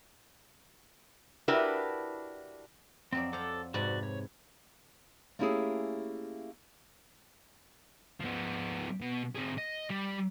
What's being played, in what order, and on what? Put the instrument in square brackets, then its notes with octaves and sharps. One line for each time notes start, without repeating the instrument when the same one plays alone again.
[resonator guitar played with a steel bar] D4 E4 F#4 G4 A#4 B4
[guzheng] F2 F#3 D5 [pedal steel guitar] C4
[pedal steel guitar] A4 F#5 D6 [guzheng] C5 F5
[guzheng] G#2 C3 B4 [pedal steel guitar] F#4 D5
[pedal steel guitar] C#5
[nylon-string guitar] A3 A#3 C#4 E4 G4 G#4
[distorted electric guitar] F3 B3
B2
C4 G#4
D#5
G3